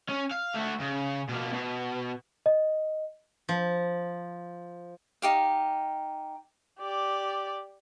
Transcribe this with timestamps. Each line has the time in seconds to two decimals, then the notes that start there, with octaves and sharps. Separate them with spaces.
0.09 C#4
0.31 F5
0.55 A3 F#4
0.81 C#3
1.29 B2 A#3
1.53 B2
2.46 D#5
3.49 F3
5.22 D#4 G4 F5
6.80 G4 D5